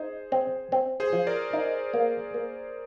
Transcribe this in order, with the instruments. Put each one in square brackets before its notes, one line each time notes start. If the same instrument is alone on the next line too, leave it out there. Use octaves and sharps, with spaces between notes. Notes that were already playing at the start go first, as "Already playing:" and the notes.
Already playing: [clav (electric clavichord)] D#4 [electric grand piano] G#4 C5
[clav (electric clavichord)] C4
C4
[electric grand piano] G#4 C5
[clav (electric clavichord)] F3
[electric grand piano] A#4 D5
[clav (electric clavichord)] D#4
A#3
A#3